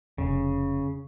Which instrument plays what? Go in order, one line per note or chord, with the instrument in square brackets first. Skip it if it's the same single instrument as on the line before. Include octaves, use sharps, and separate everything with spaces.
[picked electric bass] F1 [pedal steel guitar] C#3